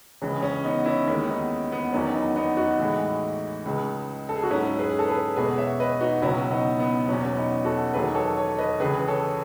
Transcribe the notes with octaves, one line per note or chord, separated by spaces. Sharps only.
C#2 C#3 E3 G#3 C#4
C#4
B3 D#4
C#4 E4
D#2 D#3 G#3 C#4 E4
B3 D#4
B3
E2 D#3 F#3 C#4
B3 D#4
B3 D#4
D#4 F#4
A2 E3 G#3
C#2 C#3 G#3
A4
G#4
F#4
G#2 F#3 C#4 E4
G#4 B4
G#4
A4
G#4 B4
E2 B2 G#3 G#4 B4
C#5 E5
B4 D#5
D#4 F#4
C#2 B2 F#3 C#4 E4
B3 D#4
B3
E2 B2 F#3 C#4
C#4
B3 D#4
F#4 A4
E2 D#3 F#3 G#4 B4
A4 C#5
A4 C#5
B4 D#5
C#2 C#3 E3 G#4 B4
A4 C#5